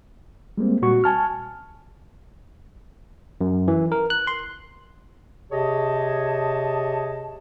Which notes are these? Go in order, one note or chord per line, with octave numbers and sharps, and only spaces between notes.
G3 G#3 A#3 C4
A#2 G3 F#4 C#6
G#5 A5 F6
F#2
E3
A#4
F#6
C6
C3 G4 G#4 C#5 D#5 A5